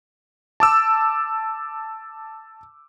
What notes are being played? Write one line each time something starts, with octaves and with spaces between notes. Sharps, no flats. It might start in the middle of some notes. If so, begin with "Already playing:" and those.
A5 D6 E6